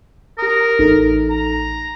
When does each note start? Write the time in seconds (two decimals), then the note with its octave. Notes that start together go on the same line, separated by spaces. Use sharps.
0.38 G4 A#4 D#6
0.79 A1 D#4 A4
1.30 A#5